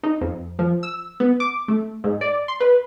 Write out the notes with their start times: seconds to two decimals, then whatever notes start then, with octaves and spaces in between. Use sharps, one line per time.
0.03 D#4
0.21 F2
0.59 F3
0.83 E6
1.20 B3
1.40 D6
1.68 A3
2.04 G#2
2.21 D5
2.48 C6
2.60 B4